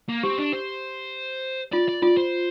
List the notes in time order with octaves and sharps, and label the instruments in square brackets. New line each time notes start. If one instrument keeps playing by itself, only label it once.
[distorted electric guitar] A#3
[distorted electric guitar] C4 [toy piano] G4
[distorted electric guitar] D4
C5
[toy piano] F4 [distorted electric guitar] D5
[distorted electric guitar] D5
[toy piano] F4 [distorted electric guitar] D5
[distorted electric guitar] C5